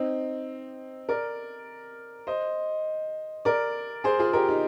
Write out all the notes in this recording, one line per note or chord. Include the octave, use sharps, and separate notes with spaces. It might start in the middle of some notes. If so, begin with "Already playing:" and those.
Already playing: C4 D#4
A#4 D5
C5 D#5
A#4 D5
G#4 C5
F4 G#4
G4 A#4
D#4 G4